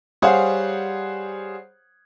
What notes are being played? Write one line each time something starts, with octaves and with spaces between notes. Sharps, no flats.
G3 G#4 C5 C#5 F5 F#5